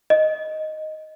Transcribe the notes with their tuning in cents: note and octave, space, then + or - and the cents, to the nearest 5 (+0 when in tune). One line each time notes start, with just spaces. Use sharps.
D#5 +5